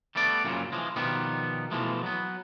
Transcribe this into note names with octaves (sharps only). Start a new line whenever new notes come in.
G3 A3 B3 D5
F#2 A#2 C#3 E3 F3
E3 F3 G#3
B2 D#3 F3 G3 B3
B2 E3 F3 G#3 A3
F#3 B3